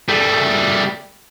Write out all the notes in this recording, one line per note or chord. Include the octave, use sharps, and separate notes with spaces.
G3 A3